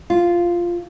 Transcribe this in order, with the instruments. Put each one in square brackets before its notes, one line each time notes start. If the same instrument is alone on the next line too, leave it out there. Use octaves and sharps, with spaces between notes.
[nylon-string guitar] F4